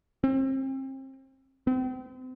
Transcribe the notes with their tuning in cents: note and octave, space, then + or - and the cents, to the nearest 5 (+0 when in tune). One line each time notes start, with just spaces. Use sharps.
C4 +35
C4 -35